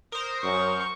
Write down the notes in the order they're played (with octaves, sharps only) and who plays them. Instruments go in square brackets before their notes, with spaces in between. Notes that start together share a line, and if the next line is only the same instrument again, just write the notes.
[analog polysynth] A#4 C5 [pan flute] D#6
[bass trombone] F#2 [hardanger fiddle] C#6